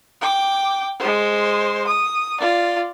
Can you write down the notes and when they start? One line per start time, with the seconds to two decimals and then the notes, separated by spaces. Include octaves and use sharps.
0.21 G5 D6
0.99 G#3 C5
1.87 D#6
2.40 F4 D5